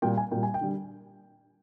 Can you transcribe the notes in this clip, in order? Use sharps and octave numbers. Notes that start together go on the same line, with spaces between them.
A#2 G3 G5
G#5
A#2 G3 G5
G#5
G5
D3 G3